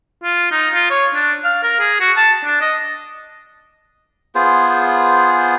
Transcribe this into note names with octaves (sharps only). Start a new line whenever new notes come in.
F4
D#4
F4
C#5
D4
F5
A#4
G#4
F#4
A5
D4
D#5
B3 F4 G#4 C5